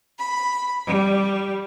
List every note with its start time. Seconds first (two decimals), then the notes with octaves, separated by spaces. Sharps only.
0.19 B5
0.87 G3